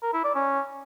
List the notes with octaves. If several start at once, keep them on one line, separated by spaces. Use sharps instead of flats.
A#4
E4
D5
C#4